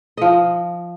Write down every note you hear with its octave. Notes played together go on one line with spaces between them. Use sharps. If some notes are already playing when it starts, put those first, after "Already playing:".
F3 D#5